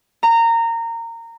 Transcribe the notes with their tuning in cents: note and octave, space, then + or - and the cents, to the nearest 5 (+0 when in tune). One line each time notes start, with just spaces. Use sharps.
A#5 -20